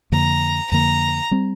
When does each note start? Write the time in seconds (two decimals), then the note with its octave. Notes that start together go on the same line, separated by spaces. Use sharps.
0.12 F2 D3 A#3 A#5
0.71 F2 D3 A#3 A#5
1.31 G3 C4